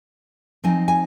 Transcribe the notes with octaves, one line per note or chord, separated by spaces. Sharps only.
F3 C4 D#4 G#5
G#5